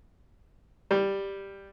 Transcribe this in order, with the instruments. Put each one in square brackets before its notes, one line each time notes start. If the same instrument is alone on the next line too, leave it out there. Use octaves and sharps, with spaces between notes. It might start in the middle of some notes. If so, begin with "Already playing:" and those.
[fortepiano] G3